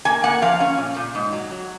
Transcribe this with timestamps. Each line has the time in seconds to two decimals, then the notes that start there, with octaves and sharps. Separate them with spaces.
0.05 A#3 G#5
0.24 A#3 F#5
0.42 F3 F5
0.60 C#4
0.78 A#2
0.96 A#2
1.15 G#2
1.32 F#3
1.51 F#3